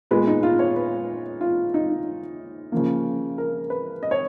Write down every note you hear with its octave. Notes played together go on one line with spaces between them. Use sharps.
A#2 G#3 B3 B4
D#4
F4
C#5
B4
F4
D#4
C#3 F3 A#3
A#4
B4
D#5
C#5